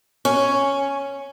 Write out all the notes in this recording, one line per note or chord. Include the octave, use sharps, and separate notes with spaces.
C#4